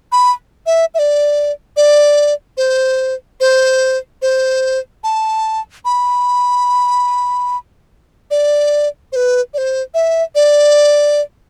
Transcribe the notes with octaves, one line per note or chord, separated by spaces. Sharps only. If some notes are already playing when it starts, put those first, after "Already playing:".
B5
E5
E5
D5
D5
C5
C5
C5
A5
B5
D5
C5
B4
D5
C5
E5
D5